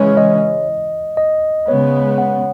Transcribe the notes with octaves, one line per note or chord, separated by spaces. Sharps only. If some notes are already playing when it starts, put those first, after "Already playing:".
Already playing: C#3 E3 G#3 C#4 C#5
D#5
D#5
C#3 G#3 B3 C#5
F#5